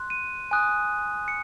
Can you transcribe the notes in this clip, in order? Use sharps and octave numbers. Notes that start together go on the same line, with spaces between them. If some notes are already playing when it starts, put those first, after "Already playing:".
Already playing: C6 F#6
D#7
G#5 D#6 F#6
C#7